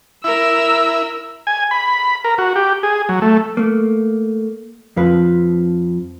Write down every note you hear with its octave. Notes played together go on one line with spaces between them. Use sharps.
E4 A#4 E6
G#5
B5
A#4
F#4
G4
G#4
F#3
A3
A3 A#3
F2 F3 B4